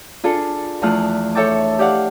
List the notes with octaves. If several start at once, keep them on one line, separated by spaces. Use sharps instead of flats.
D4 F4 G#4 A4
E2 F3 A3 F4 F6 F#6
A4 C#5 E5 G5 A5 D6
G4 D5 F5 F#5